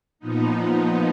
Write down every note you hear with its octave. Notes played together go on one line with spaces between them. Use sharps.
A#2 F3 B3 D#4